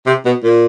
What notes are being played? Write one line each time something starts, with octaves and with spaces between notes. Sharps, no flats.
C3
B2
A#2